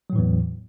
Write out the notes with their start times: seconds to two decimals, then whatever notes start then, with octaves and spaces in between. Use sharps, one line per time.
0.10 F#3
0.13 A2
0.16 E3
0.19 E2